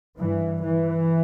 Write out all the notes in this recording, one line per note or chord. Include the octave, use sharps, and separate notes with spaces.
G2 E3
E3